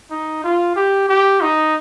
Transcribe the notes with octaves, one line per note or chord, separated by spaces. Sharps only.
D#4
F4
G4
G4
D#4